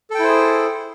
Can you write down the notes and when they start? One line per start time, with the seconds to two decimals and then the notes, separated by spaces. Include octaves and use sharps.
0.10 A4
0.15 G5
0.19 E4
0.24 C5
0.28 G#4